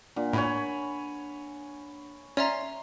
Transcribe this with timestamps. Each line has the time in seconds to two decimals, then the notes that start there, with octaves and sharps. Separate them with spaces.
0.16 A#2 D4 F#5
0.33 A2 C#5 G#5 B5
2.37 C#4 D5 E5 A#5 C6